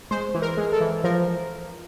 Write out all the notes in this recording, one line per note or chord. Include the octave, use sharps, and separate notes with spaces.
G#3 C5
E3
A#4
G#3
A4
E3
F3 A#4